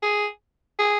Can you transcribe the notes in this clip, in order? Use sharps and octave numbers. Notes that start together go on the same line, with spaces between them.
G#4
G#4